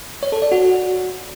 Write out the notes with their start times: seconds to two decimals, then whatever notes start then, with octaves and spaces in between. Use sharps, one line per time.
0.23 C#5
0.32 A4
0.42 D5
0.52 F#4